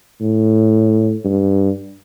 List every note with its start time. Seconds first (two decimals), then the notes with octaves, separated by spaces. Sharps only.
0.21 A2
1.24 G2